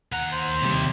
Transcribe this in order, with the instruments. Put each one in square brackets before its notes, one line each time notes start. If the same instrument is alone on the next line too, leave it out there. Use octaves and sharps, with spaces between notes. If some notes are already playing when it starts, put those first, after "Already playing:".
[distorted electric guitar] D#2 A#5 [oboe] F#5
[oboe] C5
[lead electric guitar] C3 G3